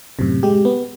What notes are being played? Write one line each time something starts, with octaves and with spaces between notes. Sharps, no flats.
F#2 A2 C3
G#3 G4
B3